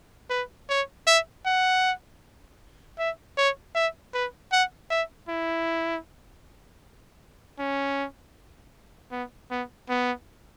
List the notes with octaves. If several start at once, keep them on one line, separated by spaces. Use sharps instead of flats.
B4
C#5
E5
F#5
E5
C#5
E5
B4
F#5
E5
E4
C#4
B3
B3
B3